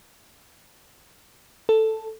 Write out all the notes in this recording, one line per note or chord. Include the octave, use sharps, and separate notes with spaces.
A4